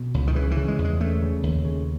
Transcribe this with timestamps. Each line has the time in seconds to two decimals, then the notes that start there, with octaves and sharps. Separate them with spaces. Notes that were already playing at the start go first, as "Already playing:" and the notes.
Already playing: B2
0.14 C#2
0.27 D#3
0.35 C#3 E3
0.51 E3
0.57 C#3
0.68 G#3
0.78 E2
0.85 G#3
1.00 C#3 A3
1.22 C#3
1.43 D#2
1.65 C#3